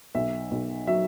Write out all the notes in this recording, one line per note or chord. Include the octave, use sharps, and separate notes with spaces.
B1 E5
B1
F#3 E5